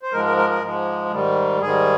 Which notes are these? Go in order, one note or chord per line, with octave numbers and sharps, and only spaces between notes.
C5
G#2 F3 G#3 A#4
A#4
A#4
A#4
G#2 F3 G#3
G#2 D#3 G3
G#2 D#3 G3 G#4